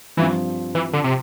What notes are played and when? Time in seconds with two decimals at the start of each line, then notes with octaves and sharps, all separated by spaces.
0.17 G2 E3 F3 C4
0.75 E3
0.93 D3
1.04 C3